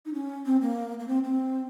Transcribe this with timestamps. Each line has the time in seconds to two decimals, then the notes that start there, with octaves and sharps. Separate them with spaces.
0.06 D#4
0.14 C#4
0.46 C4
0.61 A#3
1.00 A#3
1.08 C4
1.24 C4